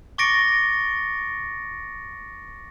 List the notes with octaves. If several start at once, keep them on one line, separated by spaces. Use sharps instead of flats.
C#6 D6 A6 A#6 C#7 D7